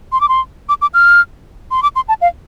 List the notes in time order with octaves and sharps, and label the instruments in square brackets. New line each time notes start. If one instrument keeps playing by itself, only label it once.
[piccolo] C6
D6
C6
D6
D6
F6
C6
D6
C6
A5
F5